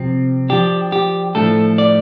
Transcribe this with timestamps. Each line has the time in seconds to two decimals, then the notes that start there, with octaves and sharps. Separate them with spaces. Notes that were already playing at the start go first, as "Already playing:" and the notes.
Already playing: C3 F3 C4
0.49 F3 D4 G4
0.92 G4
1.35 A2 F3 A3 D4 A4
1.78 D5